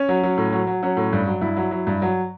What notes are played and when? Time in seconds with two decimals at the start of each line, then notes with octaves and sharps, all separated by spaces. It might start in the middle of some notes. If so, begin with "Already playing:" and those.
Already playing: C#4
0.09 F#3
0.23 F#3
0.38 A2
0.53 F#3
0.67 F#3
0.83 F#3 C#4
0.97 A2
1.13 G2
1.27 F#3
1.41 G2 E4
1.57 F#3
1.71 F#3
1.87 G2
2.02 F#3